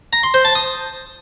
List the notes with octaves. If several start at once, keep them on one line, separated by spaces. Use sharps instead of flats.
A#5
C6
C5
A5
D#6